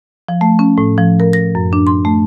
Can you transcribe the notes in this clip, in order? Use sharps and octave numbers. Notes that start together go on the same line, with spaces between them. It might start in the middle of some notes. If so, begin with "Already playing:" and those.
F3
A3
C#4
A2
F3
A#4
A#6
F#2
D4
C6
A3